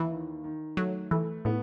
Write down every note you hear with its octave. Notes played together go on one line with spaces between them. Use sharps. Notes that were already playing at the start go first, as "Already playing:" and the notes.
Already playing: D#2 E3
D#3
D#3
F#3 A3
E3 A3
A2 B3